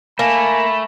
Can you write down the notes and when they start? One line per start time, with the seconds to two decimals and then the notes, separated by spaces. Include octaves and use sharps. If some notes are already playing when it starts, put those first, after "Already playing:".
0.19 A3 A#3 G#5 B5